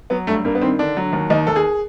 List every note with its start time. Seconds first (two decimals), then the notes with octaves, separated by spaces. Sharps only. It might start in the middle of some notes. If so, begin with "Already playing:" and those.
0.10 F#3 B3
0.27 G2 A3
0.45 G2 A#3
0.55 B3
0.61 D#3 C4
0.79 D3 D4
0.97 F#3
1.13 D#2
1.30 D#2 D#4
1.47 D#2 A4
1.56 G#4